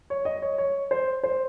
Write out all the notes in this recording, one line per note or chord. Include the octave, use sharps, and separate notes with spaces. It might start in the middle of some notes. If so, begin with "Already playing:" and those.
C#5
D#5
C#5
C#5
C5
C5